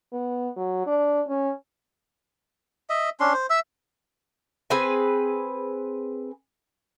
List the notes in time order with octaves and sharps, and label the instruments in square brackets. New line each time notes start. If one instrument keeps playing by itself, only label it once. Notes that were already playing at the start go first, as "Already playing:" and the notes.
[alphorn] B3
F#3
D4
C#4
[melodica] D#5 E5
C#4 D4 C6
C5
E5 E6
[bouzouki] C4 G#4 B4 G#5